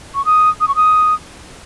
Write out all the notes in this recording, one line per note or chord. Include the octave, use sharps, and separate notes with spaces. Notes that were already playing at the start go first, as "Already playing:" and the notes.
C#6
D#6
D#6
C#6
D#6